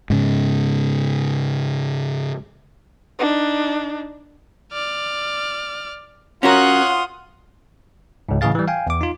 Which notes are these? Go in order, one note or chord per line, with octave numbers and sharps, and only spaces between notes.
G#2 C#3
D4 D#4
D5 F6
C#4 F4 F#4 A#4 C#5 F#5 D#6 F#6
C#2 G#2
A2 C#3 E3 G#4 F5 A6
E3 G3
F5 G5 G#5
E2 D6
D#4 F4